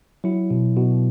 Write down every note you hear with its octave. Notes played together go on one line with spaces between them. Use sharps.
F#3 E4
B2
B2